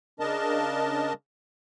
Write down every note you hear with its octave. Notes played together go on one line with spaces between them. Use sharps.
C#3 D4 A#4 D#5 A5